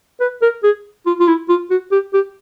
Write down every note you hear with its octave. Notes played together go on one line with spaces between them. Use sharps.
B4
A#4
G#4
F4
F4
E4
F4
F#4
G4
G4